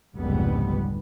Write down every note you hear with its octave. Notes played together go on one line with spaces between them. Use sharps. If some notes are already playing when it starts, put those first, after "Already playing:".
F1 C#2 G#2 D3 G3 B3